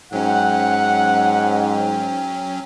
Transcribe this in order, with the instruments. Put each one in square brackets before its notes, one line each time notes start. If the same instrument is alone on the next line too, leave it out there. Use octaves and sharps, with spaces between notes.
[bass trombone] G#2 [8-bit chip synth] F#3 C#4 [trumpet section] F#5 [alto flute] G5